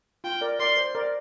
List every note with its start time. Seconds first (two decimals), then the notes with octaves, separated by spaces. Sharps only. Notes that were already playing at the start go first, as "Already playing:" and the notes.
0.24 F4 G5
0.41 A#4 D5
0.59 A#4 D5 C6
0.77 C5
0.95 A#4 D5